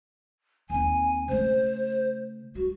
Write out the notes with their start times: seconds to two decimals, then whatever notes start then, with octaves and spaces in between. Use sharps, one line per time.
0.70 D#2 C4 G#5
1.28 C#3 A3 C5
2.55 G3 F#4